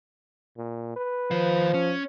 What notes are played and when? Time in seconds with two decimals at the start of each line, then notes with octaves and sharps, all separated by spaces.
0.57 A#2
0.96 B4
1.31 D#3 F3 F5
1.74 C#4